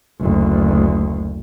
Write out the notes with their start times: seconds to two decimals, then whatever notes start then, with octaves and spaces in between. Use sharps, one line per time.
0.20 F#1 D2